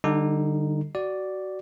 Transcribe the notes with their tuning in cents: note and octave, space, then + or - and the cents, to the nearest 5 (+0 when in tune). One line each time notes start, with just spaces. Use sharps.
D3 +25 G3 +0 D#4 +0
F#4 +20 D5 +0